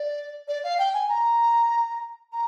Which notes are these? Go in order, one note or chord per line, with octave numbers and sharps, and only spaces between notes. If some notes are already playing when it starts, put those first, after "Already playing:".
Already playing: D5
D5
F5
G5
G#5
A#5
A#5